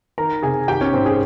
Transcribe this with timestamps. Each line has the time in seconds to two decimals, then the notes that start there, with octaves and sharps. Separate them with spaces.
0.18 D#3 A#4 A#5
0.42 C3 G#4 G#5
0.68 D#3 G4 G5
0.81 C#4 C#5
0.93 G#2 C4 C5
1.06 G#4